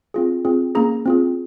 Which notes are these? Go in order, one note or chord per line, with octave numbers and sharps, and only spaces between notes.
C4 F4 G#4
C4 F4 G#4
A#3 C#4 G#4 A#5
C4 F4 G#4